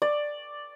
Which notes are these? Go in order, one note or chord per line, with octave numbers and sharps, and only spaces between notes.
D5